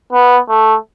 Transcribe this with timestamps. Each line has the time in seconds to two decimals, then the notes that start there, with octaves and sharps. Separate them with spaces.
0.13 B3
0.49 A3